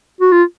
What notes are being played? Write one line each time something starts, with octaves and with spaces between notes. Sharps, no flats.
F#4
F4